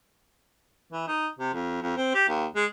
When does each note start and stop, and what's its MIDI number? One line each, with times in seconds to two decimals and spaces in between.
0.92 1.06 52
1.08 1.27 63
1.39 1.52 48
1.54 1.81 41
1.82 1.95 41
1.97 2.15 60
2.15 2.24 67
2.29 2.45 39
2.56 2.65 56